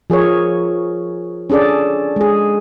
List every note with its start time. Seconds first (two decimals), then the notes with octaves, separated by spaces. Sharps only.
0.10 F3 G#4 A#4 C#5
1.50 C#4 D4 G#4 A4 D5
2.16 G#3 G#4